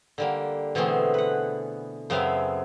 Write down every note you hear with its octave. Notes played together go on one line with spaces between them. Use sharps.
D3 G3 A#3
B2 D3 E3 A3 C4 G#4
B4 F#5
F#2 C#3 B3 C4 E5 F5